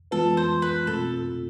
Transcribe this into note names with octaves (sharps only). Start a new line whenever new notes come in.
E3 G#3 B3 F4 A4 B4
C5
B4
B2 A3 C4 F4 A4